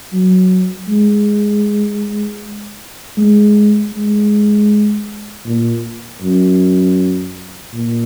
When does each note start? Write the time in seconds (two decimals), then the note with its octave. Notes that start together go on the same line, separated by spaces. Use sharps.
0.13 F#3
0.88 G#3
3.17 G#3
3.93 G#3
5.46 A#2
6.22 F#2
7.74 A#2